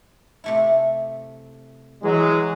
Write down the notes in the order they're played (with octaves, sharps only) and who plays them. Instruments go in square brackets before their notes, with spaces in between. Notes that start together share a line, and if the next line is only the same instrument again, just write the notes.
[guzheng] C3 A3 E4
[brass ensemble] E3 F#3 G#3